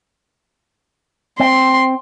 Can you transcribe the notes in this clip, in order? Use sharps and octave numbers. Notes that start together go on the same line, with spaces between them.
C4 C6